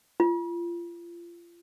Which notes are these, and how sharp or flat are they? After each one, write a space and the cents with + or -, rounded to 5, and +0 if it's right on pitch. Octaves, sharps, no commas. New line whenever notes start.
F4 -30